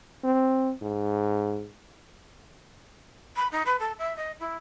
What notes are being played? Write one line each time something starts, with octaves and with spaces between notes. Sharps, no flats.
C4
G#2
B5
D#4
B4
A4
E5
D#5
E4